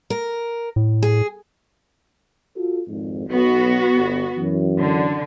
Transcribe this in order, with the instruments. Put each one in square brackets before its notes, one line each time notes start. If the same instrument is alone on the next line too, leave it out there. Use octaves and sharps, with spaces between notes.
[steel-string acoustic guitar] A#4
[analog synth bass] A2
[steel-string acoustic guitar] G#4
[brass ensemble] F4 F#4 A4
G#1 F2 G#2
[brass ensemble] B1 [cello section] B3 F#4
[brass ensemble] G1
F#2 E3
[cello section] D3